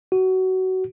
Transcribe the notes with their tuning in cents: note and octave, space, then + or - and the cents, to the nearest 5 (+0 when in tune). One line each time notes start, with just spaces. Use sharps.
F#4 +20